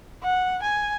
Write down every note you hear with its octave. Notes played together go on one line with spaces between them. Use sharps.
F#5
G#5